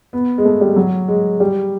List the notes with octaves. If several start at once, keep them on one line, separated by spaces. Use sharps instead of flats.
B3
G#3
A3
G3
F#3
G#3
G3